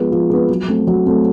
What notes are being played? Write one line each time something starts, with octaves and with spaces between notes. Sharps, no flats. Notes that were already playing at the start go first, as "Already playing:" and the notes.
Already playing: F3 G#3 B3
F3
G#3 B3
F#3
A3 C4
F#3
A3 C4